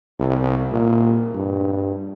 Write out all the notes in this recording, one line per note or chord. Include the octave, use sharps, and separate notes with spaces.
C2
A#2
G2